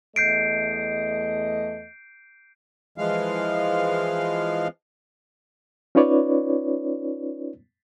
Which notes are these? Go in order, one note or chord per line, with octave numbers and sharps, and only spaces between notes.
E2 A3 D#5 G6 C7 D7
E3 F3 G#3 F5
C#4 D#4 F4 B4 C#5 D5